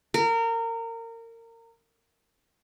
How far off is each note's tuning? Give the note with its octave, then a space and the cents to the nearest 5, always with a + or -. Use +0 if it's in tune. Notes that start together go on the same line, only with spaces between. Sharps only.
A#4 -25